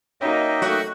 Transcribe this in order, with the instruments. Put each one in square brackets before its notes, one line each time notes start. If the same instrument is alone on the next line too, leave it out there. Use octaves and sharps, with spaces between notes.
[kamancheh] A#3 D#4 [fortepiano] C#4 F#4 [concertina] D#5 E5 G5
[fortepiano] F#3 A3 [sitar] F#4